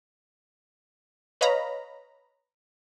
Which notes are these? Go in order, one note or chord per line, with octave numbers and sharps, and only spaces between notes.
B4 C#5 D#5 F5 A#5 B5